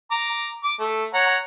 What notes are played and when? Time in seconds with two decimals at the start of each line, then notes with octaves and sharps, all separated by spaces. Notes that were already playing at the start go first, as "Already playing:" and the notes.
0.11 A#5 D6
0.64 D6
0.80 A3
1.14 C#5 F#5 A#5